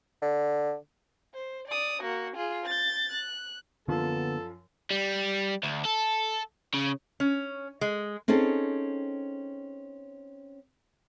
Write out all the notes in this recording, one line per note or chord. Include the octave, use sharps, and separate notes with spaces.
D3
C5
D5 D#6
A#3 F#4
F4 G#4
G6 A6
F#6
F#2 D3 F3 A#3 B3 D4 F4 A4
G3
D2
A4
C#3
C#4
G#3
C4 C#4 D#4 G#4 A4